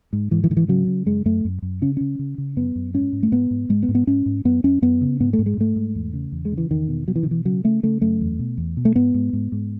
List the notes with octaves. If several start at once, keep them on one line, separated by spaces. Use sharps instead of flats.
G#2
G#2 E3
E3
G#2 D#3
E3
C#3 F#3
C#3
F#2 G#3
F#2 A3
F#2
F#2
C#3 C#4
C#3 C#4
C#3
C#3
F#2 B3
F#2
G#2 C#4
G#2
A3
G#2 B3
G#2
G#2 G#3
B3
G#2
B3
G#2 C#4
G#2
F#2 B3
F#2 C#4
F#2 B3
C#3
G#2 B3
A3
G#2
G#3
G#2 A3
G#2
E2
C#3
E2
G#3
C#3
E3
E2 D#3
B2
B2 F#3
E3
D#3
B2 E3
C#3 F#3
C#3 A3
C#3 A3
F#2 A3
E2
B2
E2
B2
A3
G#2 B3
G#2
G#2
G#2